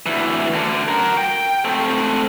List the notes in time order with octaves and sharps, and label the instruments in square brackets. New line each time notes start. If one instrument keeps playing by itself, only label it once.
[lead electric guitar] D2 E3
D2 D3
F#4 A#4
G5
A3 C4